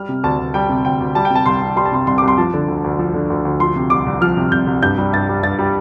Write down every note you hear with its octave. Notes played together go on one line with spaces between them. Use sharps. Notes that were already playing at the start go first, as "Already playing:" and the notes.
Already playing: G3 F6
C3
D2 A5
D2
G3 G5
C3
D2 G5
D2
G3 A5
G5
C3
A5
C2 C6
C2
G3 C6
A5
C3 C6
C2 C6
C2 D6
C6
F3 A5
D3
D2
D2
F3
D3
D2
D2
F3 C6
C3
C2 D6
C2
F3 F6
C3
C2 G6
C2
G2 G6
G3
G2 A6
G3
G2 A6
G3